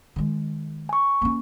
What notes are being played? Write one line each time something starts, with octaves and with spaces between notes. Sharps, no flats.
D#3 G#3
G#5 C#6
A#3 C#4